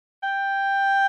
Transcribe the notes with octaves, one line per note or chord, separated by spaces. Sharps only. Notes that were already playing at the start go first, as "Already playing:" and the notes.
G5